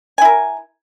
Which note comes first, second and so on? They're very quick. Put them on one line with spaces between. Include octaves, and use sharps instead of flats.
G#5 E4 A#4